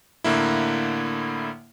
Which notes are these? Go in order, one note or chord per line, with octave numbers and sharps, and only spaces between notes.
A2 D3 A#3 E4